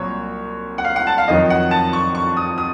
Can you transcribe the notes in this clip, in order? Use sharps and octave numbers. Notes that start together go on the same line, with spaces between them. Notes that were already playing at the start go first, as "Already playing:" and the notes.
Already playing: C2 A#2 F#3 C#5
F#5
F5
F#5
A5
F5
F2 D#3 F#3 D#5
F#5
A5
C#6
C#6
D#6
D#6